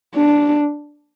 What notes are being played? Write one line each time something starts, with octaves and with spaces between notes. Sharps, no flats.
D4